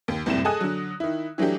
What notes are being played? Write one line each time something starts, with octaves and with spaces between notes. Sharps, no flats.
D#2
F#1 C2 A2 C3 G3 E7
G#4 A4 D#5 G#5 D#6 F#6
D3 F#3
D#3 E4
E3 F#3 A3 D4 G4